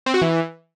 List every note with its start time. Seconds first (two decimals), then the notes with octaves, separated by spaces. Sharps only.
0.06 C4
0.14 F#4
0.22 E3